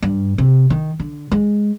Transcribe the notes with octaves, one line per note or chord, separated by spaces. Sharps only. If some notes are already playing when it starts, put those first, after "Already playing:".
G2
C3
D#3
D3
G#3